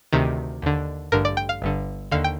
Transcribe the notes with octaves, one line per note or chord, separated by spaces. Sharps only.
D2 C3 D#3
D#2 D3
A1 G2 D3 A#4
D5
G5
F5
G1 G2 D3
D#2 D3 F5
G5